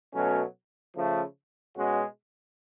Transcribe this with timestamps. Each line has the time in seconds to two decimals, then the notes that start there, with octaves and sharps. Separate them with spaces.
0.13 B2 F#3 A3 C#4
0.94 C#3 F3 A3
1.74 B2 G#3 C#4 F#4